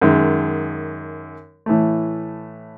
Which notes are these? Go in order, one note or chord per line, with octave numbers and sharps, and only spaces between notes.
F#2 D#3 G#3
A2 E3 A3